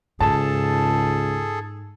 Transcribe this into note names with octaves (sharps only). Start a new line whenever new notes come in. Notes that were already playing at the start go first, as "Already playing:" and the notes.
C#2 G#2 G#4 A4 A5